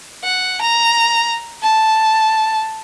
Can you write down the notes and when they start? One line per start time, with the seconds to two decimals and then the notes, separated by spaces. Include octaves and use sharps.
0.24 F#5
0.62 A#5
1.62 A5